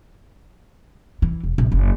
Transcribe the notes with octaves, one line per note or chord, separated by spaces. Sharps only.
E3
E1
A#1
F#1